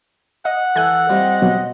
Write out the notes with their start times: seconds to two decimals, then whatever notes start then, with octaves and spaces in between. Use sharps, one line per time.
0.45 D#5 F#5
0.76 E3 A4 G#5 F#6
1.09 G3 C4 F4 D#5
1.42 B2 F#3